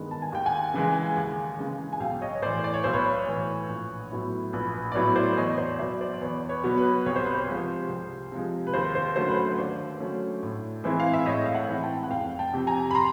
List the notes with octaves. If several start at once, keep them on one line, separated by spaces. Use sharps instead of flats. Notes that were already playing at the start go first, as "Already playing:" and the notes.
Already playing: G2 D#3 G#3 B3
A5
G#5
D#2 G5
F#5 G#5
C#3 E3 G#3
D#2
C#3 E3 G#3
G#5
B1 F5 G5
C#5 D#5
C#5
A2 E3 C5 D5
D5
C#5
B1 C5
B4 C#5
A2 E3
A#1
A2 F#3 B3 E4
A#1 B4
B4
D5
A2 F#3 B3 E4 B4 C#5
C5 D5
E2 C#5 D#5
C5 D5
B2 F#3 B3 D5 E5
C5 D5
D5
E2 B4 C#5
B4 C#5
B2 F#3 B3
B4
C2 C#5
C5
B4
C5
C3 F3 G#3
C2
C3 F3 G#3
B4
D#2 C5
C5
D3 F#3 A3 C#4 C5
B4
C5
D#2 C5 D5
D3 F#3 A3 C#4
A2
E3 G#3 C4 E4
F5
E5
A2 C#5 D#5
F5
E5 F#5
E3 G#3 C4 E4
G5 A5
F#5
F1 F5 G5
G5 A5
F2 C3
G#5 A#5
B5
A#5 C6